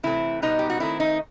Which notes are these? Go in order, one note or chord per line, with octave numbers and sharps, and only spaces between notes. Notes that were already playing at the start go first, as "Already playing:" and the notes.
C3 E3 A3 C4 E4
B2 G3 B3 D#4
G4
F#4
D#3 A3 C4 E4
D#4